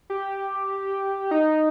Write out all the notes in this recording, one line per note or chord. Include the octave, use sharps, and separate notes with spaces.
G4
D#4